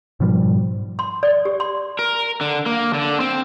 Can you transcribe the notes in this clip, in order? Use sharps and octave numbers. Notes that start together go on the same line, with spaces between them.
G#2 B2 F3 G3
C6
D5
G4
C6
A#4
D3
A#3
D3
C4